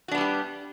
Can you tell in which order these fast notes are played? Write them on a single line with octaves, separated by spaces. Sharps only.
F#4 D4 B3 G3 G4